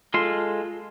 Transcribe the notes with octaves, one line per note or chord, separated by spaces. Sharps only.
G#3 F4 A4 C6